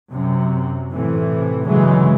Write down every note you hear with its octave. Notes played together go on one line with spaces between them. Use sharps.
F#2 C3
A2 C3 E3
G1 C#3 E3 F#3 G#3